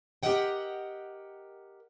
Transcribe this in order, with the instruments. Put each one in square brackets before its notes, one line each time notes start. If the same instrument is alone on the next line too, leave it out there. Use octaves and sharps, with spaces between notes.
[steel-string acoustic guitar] G4 G#4 A#4 D#5 F#5 G5